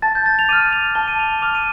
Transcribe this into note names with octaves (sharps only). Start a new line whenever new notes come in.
A5 A6
G6
A6
F7
D6 F6 D#7
F7
A5 G7
D#7
F7
D6 F6 F7
D#7